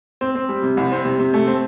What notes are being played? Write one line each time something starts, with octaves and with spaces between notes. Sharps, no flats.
C4
C4
G3
C3
C2
C4
C3
C3
A3
C4